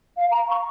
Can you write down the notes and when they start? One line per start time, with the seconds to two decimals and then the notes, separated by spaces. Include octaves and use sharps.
0.16 F5
0.32 A#5
0.48 C#6